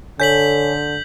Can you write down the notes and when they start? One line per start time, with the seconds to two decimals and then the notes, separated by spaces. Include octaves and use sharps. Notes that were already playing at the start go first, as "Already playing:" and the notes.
0.20 D3 A4 C#5 G#5 G6 B6 F#7